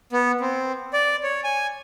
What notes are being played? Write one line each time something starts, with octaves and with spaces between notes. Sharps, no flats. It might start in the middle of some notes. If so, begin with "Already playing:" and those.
B3
C4
D5
C#5
G#5